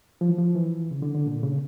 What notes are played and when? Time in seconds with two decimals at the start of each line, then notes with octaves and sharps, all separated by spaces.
0.21 F3
0.29 E3
0.38 F3
0.55 E3
0.91 C#3
1.02 D3
1.15 D3
1.27 A#2
1.43 C#3